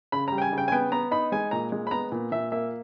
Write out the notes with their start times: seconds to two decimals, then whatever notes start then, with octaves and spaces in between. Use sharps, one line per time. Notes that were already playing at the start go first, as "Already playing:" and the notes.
0.12 C#3 B5
0.28 G3 A#5
0.38 G5
0.42 G#5
0.53 C#3 G5
0.68 G#5
0.72 B3 G5
0.92 B3 A#5
1.11 D#4 B5
1.32 G#3 G#5
1.51 A#2 A#5
1.72 G#3
1.87 B5
1.91 B3 A#5
2.12 A#2
2.32 A#2 E5
2.52 A#3 E5